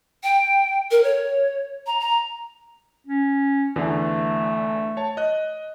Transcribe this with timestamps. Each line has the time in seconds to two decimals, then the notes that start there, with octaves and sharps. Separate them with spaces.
0.24 G5
0.91 A#4
1.03 C#5
1.87 A#5
2.00 A#5
3.07 C#4
3.76 E2 D3 E3 A3
4.97 C#5 A5
5.17 D#5 F#6